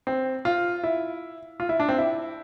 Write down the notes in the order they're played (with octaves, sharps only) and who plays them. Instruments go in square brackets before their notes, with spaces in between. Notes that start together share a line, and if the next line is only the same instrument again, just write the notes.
[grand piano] C4
F4
E4
F4
E4
D4
C4
E4